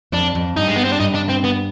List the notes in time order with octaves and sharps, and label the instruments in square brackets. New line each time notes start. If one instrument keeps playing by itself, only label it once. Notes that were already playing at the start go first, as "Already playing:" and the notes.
[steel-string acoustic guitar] F2 [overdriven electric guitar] D4
[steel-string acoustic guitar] F2
[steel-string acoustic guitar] G2 [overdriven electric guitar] D#4
[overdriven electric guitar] G#3
B3
C4
D4
[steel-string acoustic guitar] G2 [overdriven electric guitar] D#4
[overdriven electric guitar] D4
C4
B3